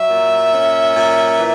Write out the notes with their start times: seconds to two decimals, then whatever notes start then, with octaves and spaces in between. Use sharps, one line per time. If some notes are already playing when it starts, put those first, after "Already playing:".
Already playing: F#3 E5
0.10 A#2
0.53 C#4
0.95 A#2
1.38 E3